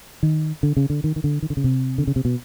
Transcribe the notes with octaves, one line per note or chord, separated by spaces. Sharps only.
D#3
D3
C#3
D3
D#3
D#3
D3
D#3
D3
C#3
C3
D3
C#3
C3
B2